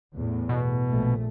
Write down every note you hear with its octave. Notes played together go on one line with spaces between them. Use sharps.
E2 A2
B2
A#1 A3